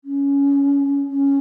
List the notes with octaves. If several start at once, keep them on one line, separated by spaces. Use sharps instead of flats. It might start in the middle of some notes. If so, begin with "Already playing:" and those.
C#4
C#4